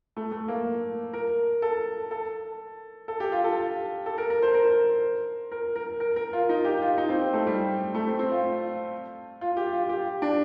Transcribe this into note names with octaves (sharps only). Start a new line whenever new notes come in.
A3
A3
A#3
A#4
A4
A4
A4
G4
F4
A4
A4
A#4
A#4
C5
A#4
A#4
A#4
A#4
A#4
F4
D#4
G4
F4
D#4
C4
C4
A3
G3
A3
C4
C4
F4
F4
G4
F4
G4
D4